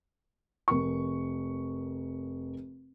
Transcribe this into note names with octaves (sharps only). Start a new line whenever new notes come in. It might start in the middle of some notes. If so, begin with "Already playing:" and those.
F1 A#4 C#6